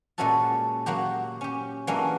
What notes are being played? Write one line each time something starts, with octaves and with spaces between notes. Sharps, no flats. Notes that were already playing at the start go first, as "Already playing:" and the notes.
A#2 G#3 A3 C#4 F#4 A4
F#3 A#3 F#4 G4
C#4 G4
E3 F#3 G#3 A#3 C#4 D4